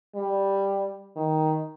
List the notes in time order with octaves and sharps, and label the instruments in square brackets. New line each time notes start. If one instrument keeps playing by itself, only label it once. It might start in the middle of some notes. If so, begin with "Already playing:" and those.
[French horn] G3
D#3